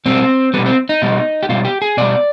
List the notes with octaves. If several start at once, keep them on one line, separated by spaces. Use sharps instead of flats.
B2 G3 C4
B2 G3 B3
C4
D#4
B2 G3
G4
B2 G3 F4
G4
G#4
B2 G3 D5